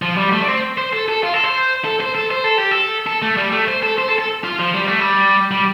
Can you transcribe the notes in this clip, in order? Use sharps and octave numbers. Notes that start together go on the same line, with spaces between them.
F3
G3
A3
D4
C4
C5
A4
A4
F4
A4
C5
A4
C5
A4
C5
A4
G4
A4
A4
A3
G3
A3
C5
A4
C5
A4
A4
F4
F3
G3
A3
G3
G3